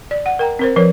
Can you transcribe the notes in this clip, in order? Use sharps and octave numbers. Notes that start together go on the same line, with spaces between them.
D5
F#5
A#4 G5 A#5
C4 A#4 C5
F3 A#4 B4 C#5